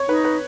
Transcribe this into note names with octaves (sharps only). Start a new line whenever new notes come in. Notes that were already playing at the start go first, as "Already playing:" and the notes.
Already playing: C#5
D#4 B4
B4